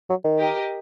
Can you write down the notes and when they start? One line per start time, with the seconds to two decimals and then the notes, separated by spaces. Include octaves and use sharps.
0.10 F#3
0.24 D#3
0.38 G4 A#4 D#5